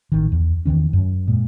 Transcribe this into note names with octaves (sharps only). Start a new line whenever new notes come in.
A1 D#3
E2
E2 D#3 E3 C#4
F#2
A#2 G#3